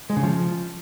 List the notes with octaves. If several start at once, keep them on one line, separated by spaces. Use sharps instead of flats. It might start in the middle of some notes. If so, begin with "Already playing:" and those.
G#3
C#3
F3